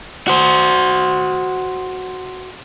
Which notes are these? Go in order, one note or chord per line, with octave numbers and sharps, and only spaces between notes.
F#4 C5